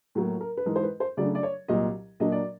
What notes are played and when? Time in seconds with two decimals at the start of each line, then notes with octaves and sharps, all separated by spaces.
0.15 A2 F#3 A#3
0.41 A#4
0.57 B4
0.66 G#2 E3 G#3 A#4
0.76 C5
0.83 B4
1.00 C5
1.17 C#3 F#3 A3 D4 D5
1.35 D5
1.43 C#5
1.68 C2 A#2 F#3 D#5
2.20 A#2 F#3 A#3 D4 D#5
2.32 D5